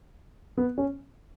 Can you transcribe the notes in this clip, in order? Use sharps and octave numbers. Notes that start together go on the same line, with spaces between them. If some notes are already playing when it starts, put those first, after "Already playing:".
B3
C#4